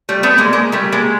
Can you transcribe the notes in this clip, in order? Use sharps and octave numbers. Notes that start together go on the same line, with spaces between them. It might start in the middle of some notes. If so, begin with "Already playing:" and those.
G3 A3
A3 B3
G#3 A#3
G#3 A#3
G3 A3
G#3 A#3